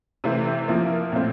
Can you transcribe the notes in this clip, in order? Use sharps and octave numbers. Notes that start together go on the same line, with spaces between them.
C3 E3 A3 C4
F3 A#3 E4
A#2 A3 C4